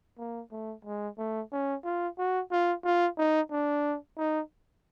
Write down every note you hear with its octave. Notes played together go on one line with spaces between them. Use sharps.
A#3
A3
G#3
A3
C#4
F4
F#4
F4
F4
D#4
D4
D#4